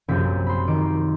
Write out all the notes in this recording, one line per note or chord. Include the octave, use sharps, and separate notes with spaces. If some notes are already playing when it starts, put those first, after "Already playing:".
A#1 F#2 C3 F3 G4 B6
B5 C6
D#3 D6